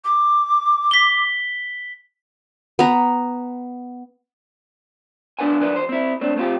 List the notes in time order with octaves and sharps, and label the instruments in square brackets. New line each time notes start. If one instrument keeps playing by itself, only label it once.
[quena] D6
[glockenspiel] B6 G7
[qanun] B3 A#5
[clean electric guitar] C#2 B3 D4 B4 F#5 G#5
F#2 B2 D3 E3 B4 D5
E2 C5
C4 E4
A3 C4 D4
A3 B3 C4 E4 F4 G4